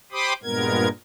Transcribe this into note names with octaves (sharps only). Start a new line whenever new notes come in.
G4 C5 B5 C6 D6 D#6
G2 A#2 G#3 B3 A#4 G#6